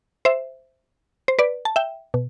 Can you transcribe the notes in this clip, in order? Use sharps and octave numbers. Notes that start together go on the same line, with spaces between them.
C5 E5
C5
B4 D5
A5
E5 G5
B2